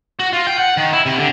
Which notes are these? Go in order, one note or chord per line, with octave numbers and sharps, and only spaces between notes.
F#4
F4
G5
F#5
D#3
E4
C3
D3